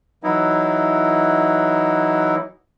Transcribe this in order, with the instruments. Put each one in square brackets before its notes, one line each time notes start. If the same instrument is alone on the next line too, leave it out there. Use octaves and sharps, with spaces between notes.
[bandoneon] E3 F#3 D#4 E4